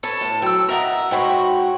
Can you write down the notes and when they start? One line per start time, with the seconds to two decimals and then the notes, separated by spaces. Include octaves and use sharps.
0.03 A4 B4 C#5 A5
0.21 A2
0.42 F#3 G5 E6
0.69 A#4 D#5 E5 F#5 A#5
1.11 G#2 F#4 C#5 G5 B5 C6